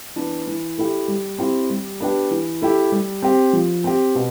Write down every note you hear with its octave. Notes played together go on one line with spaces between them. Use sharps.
E3 B3 D4
E3
A3 E4 G4
G3
C4 E4 G4
G3
B3 D4 G4
E3
A3 E4 G4
G3
C4 G4
F3
C4 G4
B2